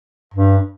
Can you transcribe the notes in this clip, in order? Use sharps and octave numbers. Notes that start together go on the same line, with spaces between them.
G2